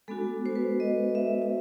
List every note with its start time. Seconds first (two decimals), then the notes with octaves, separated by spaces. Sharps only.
0.08 G#3 B3 D4 F#4 A4
0.46 C5
0.56 B4
0.80 D#5
1.15 E5
1.42 E5